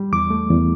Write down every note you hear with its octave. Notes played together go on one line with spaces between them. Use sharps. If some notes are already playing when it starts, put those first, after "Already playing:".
Already playing: G3
E2 D6
A3
E2